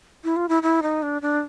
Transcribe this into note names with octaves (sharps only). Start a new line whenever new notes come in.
E4
F4
E4
E4
D#4
D4
D4